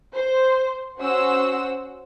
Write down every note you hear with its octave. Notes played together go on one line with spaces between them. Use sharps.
C5
C#4 F#4 C5 F#5 E6